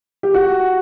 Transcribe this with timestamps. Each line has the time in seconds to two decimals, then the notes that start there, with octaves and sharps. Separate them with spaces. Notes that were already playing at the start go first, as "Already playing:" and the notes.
0.23 G4
0.34 F#4